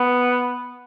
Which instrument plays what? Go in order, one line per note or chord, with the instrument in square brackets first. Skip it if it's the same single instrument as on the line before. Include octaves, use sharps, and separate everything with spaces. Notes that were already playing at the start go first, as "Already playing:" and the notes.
Already playing: [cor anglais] B3